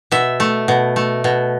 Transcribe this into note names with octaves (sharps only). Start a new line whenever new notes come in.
B2 E5
A3
B2
A3
B2